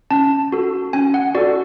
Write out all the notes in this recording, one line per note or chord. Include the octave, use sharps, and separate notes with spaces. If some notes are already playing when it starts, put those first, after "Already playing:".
C#4 A5
F#4 A4
C#4 G#5
F#5
F#4 A4 D5